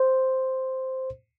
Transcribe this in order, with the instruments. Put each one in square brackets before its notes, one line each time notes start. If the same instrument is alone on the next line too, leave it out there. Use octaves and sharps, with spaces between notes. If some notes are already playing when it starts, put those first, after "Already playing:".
Already playing: [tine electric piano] C5